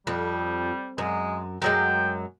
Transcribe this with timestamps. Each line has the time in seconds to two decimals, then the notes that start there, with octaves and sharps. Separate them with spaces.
0.07 F2 G3
0.98 F#2 G#3
1.62 F#2 F#3 G#3 G5